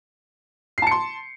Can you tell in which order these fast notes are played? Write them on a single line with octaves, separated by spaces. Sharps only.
C7 A5 C#7 C6